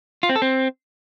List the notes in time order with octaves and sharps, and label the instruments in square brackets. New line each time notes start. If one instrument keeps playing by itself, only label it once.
[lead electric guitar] F4
C4
A4
C4